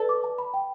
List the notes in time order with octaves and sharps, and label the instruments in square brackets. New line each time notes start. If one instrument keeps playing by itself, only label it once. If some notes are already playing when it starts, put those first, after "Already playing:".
Already playing: [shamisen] A4 [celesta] B4 D5
[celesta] D6
A5
B5
G5